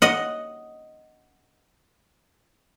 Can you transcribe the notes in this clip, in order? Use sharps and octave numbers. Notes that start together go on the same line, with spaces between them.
D#5 F#5